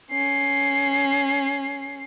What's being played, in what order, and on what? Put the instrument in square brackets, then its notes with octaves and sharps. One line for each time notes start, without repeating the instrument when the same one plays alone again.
[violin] C#4 C7